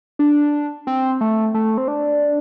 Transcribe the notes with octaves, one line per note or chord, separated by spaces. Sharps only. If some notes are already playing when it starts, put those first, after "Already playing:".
D4
C4
A3
A3
C4
D4